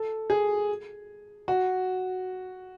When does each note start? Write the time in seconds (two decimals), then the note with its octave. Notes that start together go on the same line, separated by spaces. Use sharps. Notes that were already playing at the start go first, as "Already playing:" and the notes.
Already playing: A4
0.30 G#4
1.48 F#4